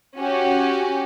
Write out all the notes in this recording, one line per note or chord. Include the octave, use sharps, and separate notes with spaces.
C#4 F#4 G4